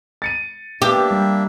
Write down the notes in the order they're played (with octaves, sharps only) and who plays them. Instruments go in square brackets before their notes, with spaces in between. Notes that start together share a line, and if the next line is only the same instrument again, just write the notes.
[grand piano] A6 C#7 D#7
[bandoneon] A#3 D4 E5 [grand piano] B3 [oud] G4
[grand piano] G3